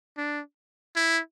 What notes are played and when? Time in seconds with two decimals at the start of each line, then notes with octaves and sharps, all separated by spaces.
0.17 D4
0.96 E4